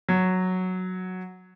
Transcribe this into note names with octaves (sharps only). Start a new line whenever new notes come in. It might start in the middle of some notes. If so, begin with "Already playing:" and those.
F#3